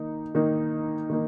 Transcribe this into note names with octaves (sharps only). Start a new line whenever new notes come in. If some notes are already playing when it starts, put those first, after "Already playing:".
Already playing: D#3 A#3 D#4
D#3 A#3 D#4
D#3 A#3 D#4